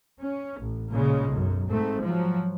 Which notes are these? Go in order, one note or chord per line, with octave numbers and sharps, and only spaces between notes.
C#4
A1
A#2 C#3 G#3
B1 F#2
G#2 A3 C4
F3 F#3